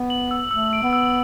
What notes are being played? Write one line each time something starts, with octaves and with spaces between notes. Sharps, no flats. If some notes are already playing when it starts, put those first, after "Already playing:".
Already playing: B3
F#7
E6
A3 E6
D7
B3
E6